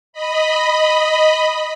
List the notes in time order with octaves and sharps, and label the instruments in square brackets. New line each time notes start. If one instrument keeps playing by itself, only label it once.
[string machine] D#5 B5